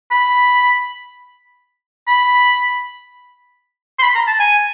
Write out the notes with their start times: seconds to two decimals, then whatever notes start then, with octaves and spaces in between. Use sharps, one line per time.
0.11 B5
2.07 B5
3.99 C6
4.03 B5
4.15 A#5
4.27 A5
4.40 G#5